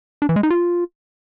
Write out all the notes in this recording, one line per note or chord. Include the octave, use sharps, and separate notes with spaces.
D4
E3
G#3
D#4
F4